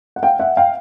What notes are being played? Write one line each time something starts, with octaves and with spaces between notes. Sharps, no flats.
F#5
F5 G5
E5 F#5
F5 G5